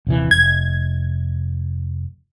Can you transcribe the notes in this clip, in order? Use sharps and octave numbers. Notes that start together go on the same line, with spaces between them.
D#1 C3 E3
F1 G#6